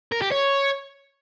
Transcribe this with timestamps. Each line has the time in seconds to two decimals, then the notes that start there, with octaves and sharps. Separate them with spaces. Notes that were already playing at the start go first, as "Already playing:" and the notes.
0.12 A#4
0.22 G4
0.32 C#5